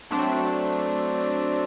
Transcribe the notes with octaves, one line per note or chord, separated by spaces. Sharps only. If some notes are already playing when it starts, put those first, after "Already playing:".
F#3 A3 C4 D4